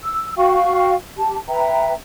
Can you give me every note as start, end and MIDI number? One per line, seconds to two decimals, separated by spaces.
0.04 0.33 88
0.37 0.93 66
0.37 0.93 77
0.37 0.93 79
0.37 0.93 85
1.18 1.36 67
1.18 1.36 81
1.48 1.93 71
1.48 1.93 76
1.48 1.93 79
1.48 1.93 82